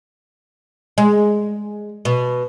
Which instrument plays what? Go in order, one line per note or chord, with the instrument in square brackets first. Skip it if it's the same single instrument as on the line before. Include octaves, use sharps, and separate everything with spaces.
[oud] G#3
B2